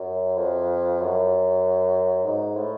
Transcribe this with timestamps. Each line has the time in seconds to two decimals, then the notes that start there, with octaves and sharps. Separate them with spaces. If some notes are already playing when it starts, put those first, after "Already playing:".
Already playing: F#2
0.37 F2
1.01 F#2
2.24 G#2
2.56 A2